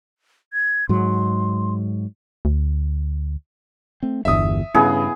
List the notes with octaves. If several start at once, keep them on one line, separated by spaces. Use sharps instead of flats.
G#6
G#2 F#3 C6
D2
A3 C4
G1 E2 G2 E5 D#6
G2 C#3 B3 E4 G#4